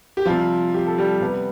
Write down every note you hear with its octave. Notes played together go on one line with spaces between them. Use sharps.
G4
C3 F3 G3 F4
G4
A4
G3 G4
C3 G3 B3